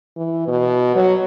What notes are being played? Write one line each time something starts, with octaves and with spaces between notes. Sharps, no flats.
E3
B2
F#3